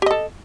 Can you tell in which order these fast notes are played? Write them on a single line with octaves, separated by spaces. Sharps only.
G4 D#5 A4